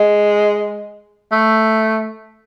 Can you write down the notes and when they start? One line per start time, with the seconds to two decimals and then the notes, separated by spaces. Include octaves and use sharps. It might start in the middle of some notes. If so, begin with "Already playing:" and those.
Already playing: G#3
1.32 A3